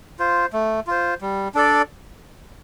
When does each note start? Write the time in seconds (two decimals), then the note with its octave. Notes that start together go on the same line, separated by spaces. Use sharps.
0.19 F4 C5
0.53 A3
0.87 F4 C5
1.21 G3
1.55 D4 A4 D5